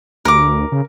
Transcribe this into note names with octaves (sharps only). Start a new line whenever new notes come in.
D2 A#4 D6
C#3